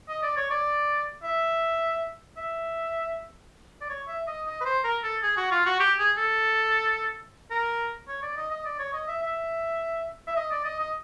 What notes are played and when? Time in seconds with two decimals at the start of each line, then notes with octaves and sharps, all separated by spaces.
0.09 D#5
0.23 D5
0.36 C#5
0.50 D5
1.23 E5
2.37 E5
3.81 D5
3.89 C#5
4.08 E5
4.27 D#5
4.46 D#5
4.61 B4
4.65 C5
4.84 A#4
5.03 A4
5.23 G#4
5.37 F#4
5.51 F4
5.66 F#4
5.80 G4
5.99 G#4
6.18 A4
7.51 A#4
8.08 C#5
8.22 D5
8.37 D#5
8.51 D#5
8.65 D5
8.79 C#5
8.93 D#5
9.08 E5
9.22 E5
10.27 E5
10.36 D#5
10.51 D5
10.65 D#5
10.79 D#5